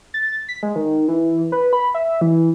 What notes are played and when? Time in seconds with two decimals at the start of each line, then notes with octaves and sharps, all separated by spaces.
0.14 A6
0.48 B6
0.63 G#3
0.76 D#3
1.08 E3
1.52 B4
1.73 B5
1.95 E5
2.21 E3